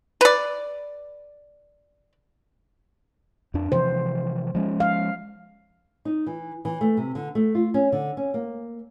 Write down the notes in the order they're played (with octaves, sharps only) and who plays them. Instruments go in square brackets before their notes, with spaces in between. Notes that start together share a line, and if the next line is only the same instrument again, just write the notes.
[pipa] B4 D5
[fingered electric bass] F2 D4
[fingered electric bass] C3 E3 F3 [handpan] C5
[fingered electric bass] F3 G#3 C#4
[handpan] F5
[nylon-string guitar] D#4
E3
E3
A3
C3
D3
A3
F4
C#4
D3
C#4
A#3